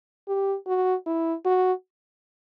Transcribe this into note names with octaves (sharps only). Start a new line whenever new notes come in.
G4
F#4
E4
F#4